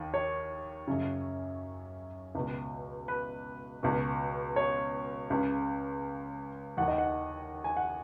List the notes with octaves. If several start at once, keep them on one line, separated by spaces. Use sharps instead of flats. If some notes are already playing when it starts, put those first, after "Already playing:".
Already playing: D#2 D#3
C#5
F#2 C#3
C#2 B2
B4
C#2 B2
C#5
C#2 C#3
D#2 D#3 F#5
D#5
F#5
G#5
F#5